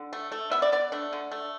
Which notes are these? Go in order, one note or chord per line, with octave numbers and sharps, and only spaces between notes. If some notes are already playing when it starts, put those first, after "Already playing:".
Already playing: D3
A3
A3
B3 E5
D5
B3 D5
A3 D4
D3
A3